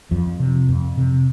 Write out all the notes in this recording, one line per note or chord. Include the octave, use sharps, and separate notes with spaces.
F2 F3
C3
F2
C3